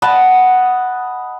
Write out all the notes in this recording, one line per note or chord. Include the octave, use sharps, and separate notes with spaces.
D#5 F#5 A5 B5